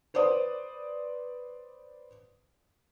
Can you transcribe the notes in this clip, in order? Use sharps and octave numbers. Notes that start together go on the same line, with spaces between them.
B4 C5 D5 D#6